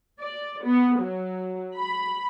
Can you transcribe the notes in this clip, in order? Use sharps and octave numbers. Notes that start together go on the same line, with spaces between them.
D5
B3
F#3
B5